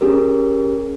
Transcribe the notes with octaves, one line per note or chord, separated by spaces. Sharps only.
C#4 G4 G#4 A#4